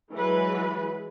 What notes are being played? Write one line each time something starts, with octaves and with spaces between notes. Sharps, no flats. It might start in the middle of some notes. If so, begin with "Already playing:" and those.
E3 F#3 G#3 B4